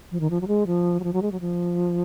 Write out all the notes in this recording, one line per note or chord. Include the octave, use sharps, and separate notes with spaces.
F3
D#3
F3
F#3
G#3
F3
F#3
F3
F#3
G#3
F#3
F3